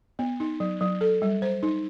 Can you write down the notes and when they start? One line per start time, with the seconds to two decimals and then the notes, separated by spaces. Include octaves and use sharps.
0.19 B3
0.40 D#4
0.60 F#3
0.81 F#3
1.01 A4
1.22 G3
1.42 C5
1.63 D#4